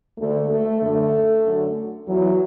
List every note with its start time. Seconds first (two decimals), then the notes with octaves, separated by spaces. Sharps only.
0.18 D2 D3 A3
0.49 A3
0.81 F#2 D3 A3
1.44 F#2 D3
2.07 E2 E3 F#3